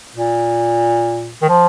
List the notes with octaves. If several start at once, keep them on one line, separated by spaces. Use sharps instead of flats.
A#2
D#3
F3